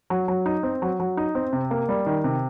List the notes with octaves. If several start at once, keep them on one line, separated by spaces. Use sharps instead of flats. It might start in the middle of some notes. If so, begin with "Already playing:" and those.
F#3
F#3
D#4
C4
F#3
F#3
D#4
C4
C3
A#3
G3
D#3
C3